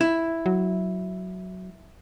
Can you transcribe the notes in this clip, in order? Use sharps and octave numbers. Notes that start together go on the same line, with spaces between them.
E4
F#3